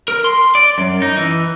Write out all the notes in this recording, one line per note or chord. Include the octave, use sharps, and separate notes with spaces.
A#4
C6
D5
F#2
D#4
E3